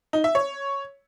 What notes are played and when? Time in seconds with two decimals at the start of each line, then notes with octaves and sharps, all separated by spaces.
0.13 D#4
0.24 E5
0.35 C#5